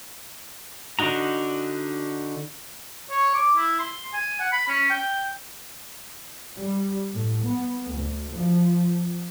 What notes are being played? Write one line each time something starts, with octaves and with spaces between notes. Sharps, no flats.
D3 D4 D#4 F#4 A#5
C#5
D6
E4
C6
G#5
F#5
B5
C#4
G5
G3
A2
B3
D2
F3